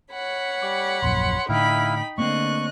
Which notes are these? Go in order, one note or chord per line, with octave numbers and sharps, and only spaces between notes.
C#5 F#5 B5
G3 D6
D#1 A#1 F#2 C6
A2 D3 D#4 E4 F5 G5 B5
D3 A3 A#3 C4 D#5 C#6 F#6